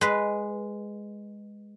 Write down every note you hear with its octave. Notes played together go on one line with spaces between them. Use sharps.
G#3 B4